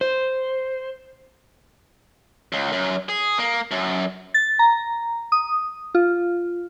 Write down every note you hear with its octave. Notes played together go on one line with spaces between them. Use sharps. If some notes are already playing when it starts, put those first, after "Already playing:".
C5
C#2
F#2
G#4
A#3
F#2
A6
A#5
D#6
F4